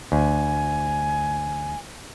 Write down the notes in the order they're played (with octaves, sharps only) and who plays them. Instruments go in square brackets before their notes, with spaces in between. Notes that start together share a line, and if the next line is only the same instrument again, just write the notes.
[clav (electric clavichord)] D2 [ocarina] G#5